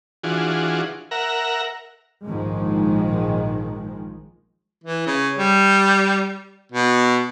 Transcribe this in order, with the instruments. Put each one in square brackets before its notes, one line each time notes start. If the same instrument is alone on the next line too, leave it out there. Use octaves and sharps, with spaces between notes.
[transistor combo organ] E3 D4 F4 F#4 G#4
A#4 E5 F#5 A#5
[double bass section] A#1 G#2 D#3 F3 G#3
[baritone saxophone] E3
C#3
G3
B2